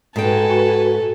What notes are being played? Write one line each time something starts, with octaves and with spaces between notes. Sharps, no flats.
G#2 F#4 A4 B4 G5 G#5